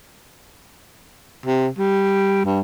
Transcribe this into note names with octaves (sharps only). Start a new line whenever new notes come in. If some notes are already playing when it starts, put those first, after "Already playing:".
C3
G3
G2